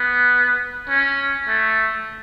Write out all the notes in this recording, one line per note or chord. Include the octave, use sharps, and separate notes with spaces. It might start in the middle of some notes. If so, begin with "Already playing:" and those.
Already playing: B3
C#4
A3